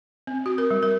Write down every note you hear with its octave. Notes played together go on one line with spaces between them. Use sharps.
C4
F#4
A#4
G3
A#4